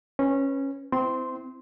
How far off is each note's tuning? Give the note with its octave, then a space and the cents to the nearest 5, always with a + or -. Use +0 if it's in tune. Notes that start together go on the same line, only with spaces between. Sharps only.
C#4 -15 B4 +0
C4 -25 E4 +0 C6 +0